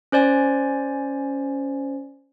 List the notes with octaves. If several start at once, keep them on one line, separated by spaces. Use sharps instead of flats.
C#4 C5 D5 G#5